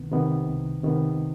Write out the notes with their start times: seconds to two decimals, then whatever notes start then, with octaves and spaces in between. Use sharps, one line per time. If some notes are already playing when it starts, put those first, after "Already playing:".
Already playing: C2 C3 D#3 B3
0.12 C3 D#3 B3
0.48 C2
0.83 C3 D#3 B3